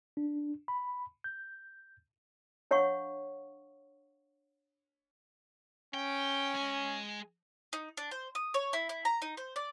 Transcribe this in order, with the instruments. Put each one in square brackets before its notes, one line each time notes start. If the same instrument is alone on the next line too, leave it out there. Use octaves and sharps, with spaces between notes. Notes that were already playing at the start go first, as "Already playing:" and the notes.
[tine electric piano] D4
B5
G6
[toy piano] D4 C#5 F5 F#5 C#6
[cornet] C#4 [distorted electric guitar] G5
[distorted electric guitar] G#3 G#5
[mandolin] D#4
D4
C5
D#6
C#5
E4
E4
A#5
D#4
C5
D5